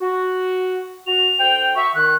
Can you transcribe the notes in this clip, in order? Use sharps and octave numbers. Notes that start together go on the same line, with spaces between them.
F#4
F#4 F7
D2 C5 G5
F#4 E5 C#6
D#3 F#6